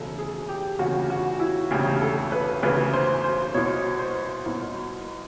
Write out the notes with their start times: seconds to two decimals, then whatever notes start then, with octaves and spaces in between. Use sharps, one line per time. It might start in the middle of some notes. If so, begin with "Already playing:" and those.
Already playing: E1 D2 C#3 A4
0.18 G#4
0.49 G4
0.79 E1 D2 C#3 F#4
1.10 F#4
1.40 E4
1.71 E1 D2 C#3 G4
2.01 A4
2.32 B4
2.63 E1 D2 C#3 B4
2.93 C5
3.24 C5
3.54 C2 B2 C#5
3.99 C5
4.46 C2 B2